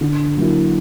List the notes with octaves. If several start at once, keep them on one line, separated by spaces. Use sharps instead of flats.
D3
F#3 A#3 E4